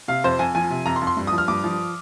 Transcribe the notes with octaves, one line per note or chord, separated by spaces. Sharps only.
C3 F5
F2 C5
F2 G#5
F3 G#5
C3
F2 A#5
C6
F2
C6
G2
F3 D#6
F6
G2 D6
F3